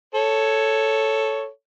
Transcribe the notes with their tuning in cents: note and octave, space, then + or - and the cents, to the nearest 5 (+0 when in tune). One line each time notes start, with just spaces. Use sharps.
A4 +0 C#5 +0